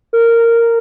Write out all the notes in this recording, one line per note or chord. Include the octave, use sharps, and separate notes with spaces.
A#4